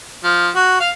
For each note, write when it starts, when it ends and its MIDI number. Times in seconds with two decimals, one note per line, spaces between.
0.24 0.50 53
0.55 0.76 66
0.80 0.90 77